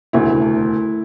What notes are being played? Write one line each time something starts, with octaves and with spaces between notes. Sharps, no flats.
E1 D2 C#3 E4
A3